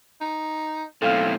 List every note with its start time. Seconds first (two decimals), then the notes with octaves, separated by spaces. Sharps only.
0.21 D#4
1.02 B1 A2 C4 A4 F5 F6